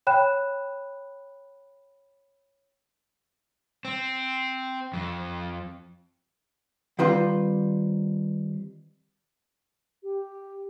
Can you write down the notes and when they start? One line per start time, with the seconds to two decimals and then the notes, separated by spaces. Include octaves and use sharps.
0.07 C#5 G5 B5 F#6 E7
3.85 C4
4.93 F2
6.99 D#3 G3 C4 F4 B4 C5
10.03 G4